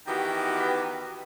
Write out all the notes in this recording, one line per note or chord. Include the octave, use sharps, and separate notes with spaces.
D#3 E3 B3 F#4 G4